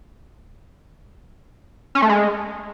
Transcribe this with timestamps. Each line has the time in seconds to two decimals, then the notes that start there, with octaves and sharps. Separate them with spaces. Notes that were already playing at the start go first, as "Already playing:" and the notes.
1.95 C#4
2.02 A3
2.09 G#3